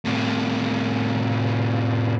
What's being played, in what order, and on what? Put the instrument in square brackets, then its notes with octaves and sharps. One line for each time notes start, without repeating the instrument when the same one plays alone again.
[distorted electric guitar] A2 C3